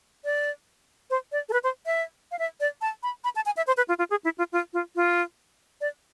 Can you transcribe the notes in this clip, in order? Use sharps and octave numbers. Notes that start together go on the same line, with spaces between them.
D5
C5
D5
A4
B4
C5
E5
F5
E5
D5
A5
B5
B5
A5
G#5
E5
C5
B4
F4
F4
G#4
E4
F4
F4
F4
F4
D5